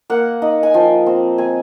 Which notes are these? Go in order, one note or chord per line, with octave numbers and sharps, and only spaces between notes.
A#3 F#5
D#4
G#5
F3 G5
C4
C4 G#5